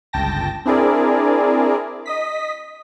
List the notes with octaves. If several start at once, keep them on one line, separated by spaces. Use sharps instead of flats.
G1 C#2 G5 A5 A#6
C4 D4 E4 G#4 A#4 D5
D#5 D#6 B6